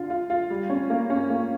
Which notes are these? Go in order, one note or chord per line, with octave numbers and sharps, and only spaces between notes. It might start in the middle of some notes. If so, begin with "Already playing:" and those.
Already playing: D3 F4
F4
F4
G3
C#4
A#3
C#4
A#3